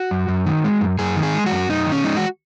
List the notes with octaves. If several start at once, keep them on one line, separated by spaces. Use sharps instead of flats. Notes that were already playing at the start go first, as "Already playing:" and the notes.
Already playing: F#4
F#2
F#2
D#3
G#3
F#2
F#2 G#4
D#3
G#4
G#3
F#4
F#2
F#2 D#4
D#3
C#4
G#3 D#4
F#4